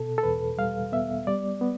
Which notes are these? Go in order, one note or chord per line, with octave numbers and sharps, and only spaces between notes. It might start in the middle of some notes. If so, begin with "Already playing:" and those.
Already playing: B2 A4
A4
E2 B4
G3 F5
B3 E5
G3 D5
B3